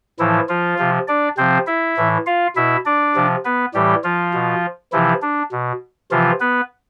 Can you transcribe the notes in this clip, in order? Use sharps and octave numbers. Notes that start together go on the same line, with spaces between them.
A2 E3 F3 E4
F3 F4
C3 F3
D4 D5
C3 F3 C4 C5
E4 E5
A2 E3
F4 F5
B2 E4 E5
D4 D5
C3 F3
B3 B4
A2 E3 G3 G4
F3 F4
B2
C3 E3 F3 E4
D4
B2
C3 E3 F3 F4
B3 B4